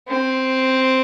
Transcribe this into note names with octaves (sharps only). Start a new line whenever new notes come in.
C4